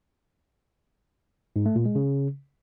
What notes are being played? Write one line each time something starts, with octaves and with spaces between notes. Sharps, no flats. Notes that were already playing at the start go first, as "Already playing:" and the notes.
G#2
A3
A#2
G#3
C#3